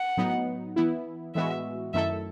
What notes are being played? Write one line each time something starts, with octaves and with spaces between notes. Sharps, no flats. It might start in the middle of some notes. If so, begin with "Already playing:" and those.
Already playing: F#5
A2 F#3 B3 D#4
E3 B3 E4
A2 E3 G#3 B3 F#4 E5
F#2 D#3 A3 E4 A4 E5